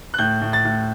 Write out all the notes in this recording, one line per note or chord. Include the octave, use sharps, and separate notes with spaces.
F#6
A2 G6
A2
A6
A2